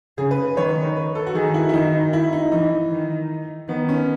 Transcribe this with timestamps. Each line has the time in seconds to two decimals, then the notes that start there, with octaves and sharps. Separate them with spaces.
0.18 C#3 G#4
0.31 B4
0.57 D#3 C#5
0.96 B4
1.15 A4
1.26 F#4
1.35 D#3 G#4
1.54 E4
1.69 E4
1.74 D#3 D#4
2.13 E4
2.33 D#4
2.52 E3 D#4
2.91 D#3
3.69 D#3 B3
3.89 C#4